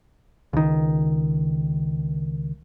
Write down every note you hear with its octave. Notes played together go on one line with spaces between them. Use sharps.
C#2 D#3